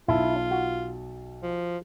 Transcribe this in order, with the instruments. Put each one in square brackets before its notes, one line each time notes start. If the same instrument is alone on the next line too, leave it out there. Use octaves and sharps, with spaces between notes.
[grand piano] B1 A5 [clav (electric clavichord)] E4 [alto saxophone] F4
[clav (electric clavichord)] F#4
[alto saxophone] F3